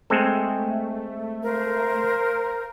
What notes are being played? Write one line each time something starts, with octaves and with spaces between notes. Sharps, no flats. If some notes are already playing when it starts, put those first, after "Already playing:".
G#3 A3 C4 A4
A#4 C5 F5